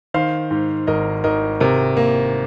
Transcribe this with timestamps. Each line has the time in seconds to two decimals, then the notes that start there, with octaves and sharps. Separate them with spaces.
0.14 D#3 C5 F5
0.51 G#2
0.87 G#1 A#4 D#5
1.24 G#1 A#4 D#5
1.60 C3 A#4
1.97 A#3